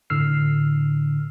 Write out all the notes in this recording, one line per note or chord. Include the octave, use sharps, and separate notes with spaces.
A2 D3 E6 F6 C7